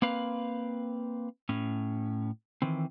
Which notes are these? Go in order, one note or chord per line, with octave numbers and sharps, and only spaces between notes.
A#3 C4 B4 F5
A2 C#4
D#3 E3 C4